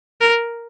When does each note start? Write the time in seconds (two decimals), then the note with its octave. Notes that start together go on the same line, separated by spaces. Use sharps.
0.21 A#4